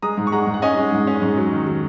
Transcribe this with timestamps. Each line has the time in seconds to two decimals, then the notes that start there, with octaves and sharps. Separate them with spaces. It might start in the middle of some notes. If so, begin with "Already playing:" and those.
0.02 G#3 A#5 D#6
0.18 G#2
0.27 C#6
0.32 G#3 F#5 A#5
0.47 G#2
0.54 F#5
0.62 C#4 D#5 G#5
0.77 G#3
0.92 G#2
1.07 C#4
1.22 G#2
1.37 F#3
1.52 D#3
1.67 F#3